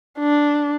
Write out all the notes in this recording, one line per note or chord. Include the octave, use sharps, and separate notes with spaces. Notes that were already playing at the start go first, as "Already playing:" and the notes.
D4